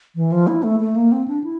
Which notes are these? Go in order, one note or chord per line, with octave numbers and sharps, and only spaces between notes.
E3
F3
E4
A3
A3
A#3
C4
D4
E4